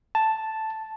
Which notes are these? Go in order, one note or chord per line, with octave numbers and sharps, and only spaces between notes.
A5